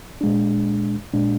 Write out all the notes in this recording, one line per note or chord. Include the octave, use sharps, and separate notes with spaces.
A#2 G#3 D4
A#2 G#3 D4